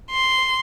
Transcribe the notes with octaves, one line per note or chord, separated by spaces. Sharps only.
C6